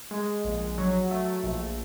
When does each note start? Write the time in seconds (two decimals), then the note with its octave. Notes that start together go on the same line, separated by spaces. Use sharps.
0.11 G#3
0.44 A#1
0.78 F#3
1.11 A3
1.44 A#1